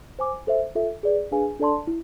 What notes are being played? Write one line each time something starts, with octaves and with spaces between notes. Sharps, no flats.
C5 G#5 D6
A4 C5 E5
F4 A4 E5
G#4 B4 D5
D4 G#4 B4 F5 G#5
D4 A4 D5 A5 C6
E4